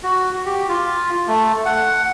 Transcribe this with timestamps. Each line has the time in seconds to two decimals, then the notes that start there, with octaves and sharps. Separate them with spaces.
0.03 F#4
0.46 G4
0.69 F4
1.27 A3
1.65 F#5